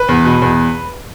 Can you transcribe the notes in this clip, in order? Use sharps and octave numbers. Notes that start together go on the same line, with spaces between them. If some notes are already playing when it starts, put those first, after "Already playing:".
Already playing: B4
E2
B2
E2